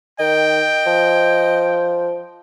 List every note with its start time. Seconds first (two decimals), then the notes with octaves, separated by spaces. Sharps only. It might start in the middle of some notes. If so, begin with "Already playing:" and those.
0.20 D#3 D#5 G5
0.87 F3